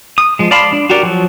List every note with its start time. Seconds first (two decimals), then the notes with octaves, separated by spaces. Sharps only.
0.18 D#6
0.39 F3 G#3
0.51 D5 F5 A5 B5 C6
0.72 D4
0.90 F#4 G4 A#4 D5
1.03 F3 F#3